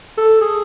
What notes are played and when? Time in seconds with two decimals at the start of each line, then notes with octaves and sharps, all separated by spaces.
0.17 A4
0.42 G#4